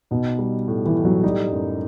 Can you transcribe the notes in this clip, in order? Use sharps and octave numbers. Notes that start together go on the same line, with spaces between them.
B2 D#4
G3
A2
E3
A2
F#3
G3 D#4
F#2